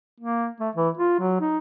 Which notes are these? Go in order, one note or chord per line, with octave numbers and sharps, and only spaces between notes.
A#3
A3
E3
F4
F#3
D#4